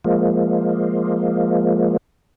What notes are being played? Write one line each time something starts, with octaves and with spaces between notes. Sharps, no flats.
F3 G#3 A#3